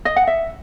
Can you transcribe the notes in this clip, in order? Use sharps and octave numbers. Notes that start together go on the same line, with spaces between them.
D#5
F#5
E5